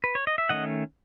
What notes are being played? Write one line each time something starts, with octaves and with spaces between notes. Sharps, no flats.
B4
C#5
D#5
E5
D#3 A3 C#4 D#5 F#5